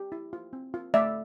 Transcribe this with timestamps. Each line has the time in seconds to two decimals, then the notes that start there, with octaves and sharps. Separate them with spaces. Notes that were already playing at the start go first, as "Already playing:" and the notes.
Already playing: G4
0.12 E4
0.33 F4
0.53 C4
0.74 F4
0.94 A3 D5 E5